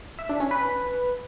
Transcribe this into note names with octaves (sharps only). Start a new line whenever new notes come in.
E5
D4
C#4
B4